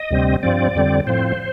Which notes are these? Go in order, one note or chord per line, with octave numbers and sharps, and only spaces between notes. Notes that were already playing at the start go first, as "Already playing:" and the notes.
Already playing: D#5
D2 C3 G3 C4
G2 F3 C4 D5
F2 D3 G3 C4
A2 F3 C4 C5